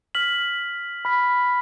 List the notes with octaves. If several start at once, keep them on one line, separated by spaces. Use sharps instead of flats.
F6 B6 F#7
B5 F6 B6